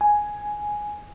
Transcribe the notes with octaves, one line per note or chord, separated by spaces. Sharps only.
G#5